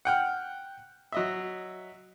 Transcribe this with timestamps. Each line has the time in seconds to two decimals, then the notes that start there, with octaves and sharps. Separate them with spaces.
0.05 F#5 G5 F6
1.12 F#3 D#5 E5